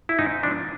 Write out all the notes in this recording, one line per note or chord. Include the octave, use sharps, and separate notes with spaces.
E4
G#2 D#4
F3 D4